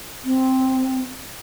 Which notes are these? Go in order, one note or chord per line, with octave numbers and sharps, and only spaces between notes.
C4